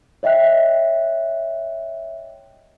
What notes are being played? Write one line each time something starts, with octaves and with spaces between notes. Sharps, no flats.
C#5 D#5 E5 G5 F#6